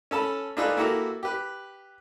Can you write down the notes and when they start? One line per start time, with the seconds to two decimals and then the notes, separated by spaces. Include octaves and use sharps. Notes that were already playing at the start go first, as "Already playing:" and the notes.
0.11 C#4 A4 A5 B5
0.57 D4 D#4 F4 G#4 A4 B4
0.77 A#3 E4 F#4 G4 A4 A#4
1.23 G4 B4